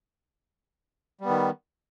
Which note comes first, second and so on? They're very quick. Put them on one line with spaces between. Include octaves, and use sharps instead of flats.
G3 B3 D#3